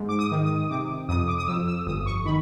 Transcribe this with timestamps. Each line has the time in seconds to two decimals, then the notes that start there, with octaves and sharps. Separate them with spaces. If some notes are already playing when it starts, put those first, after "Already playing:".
Already playing: G#2
0.09 D6
0.19 D#6
0.31 D#3
0.44 D#6
0.70 C3 D6
1.08 F2 D#6
1.28 D6
1.38 D#6
1.48 F2 E6
1.68 E6
1.86 G1 D#6
2.06 C#6
2.25 D#3 B5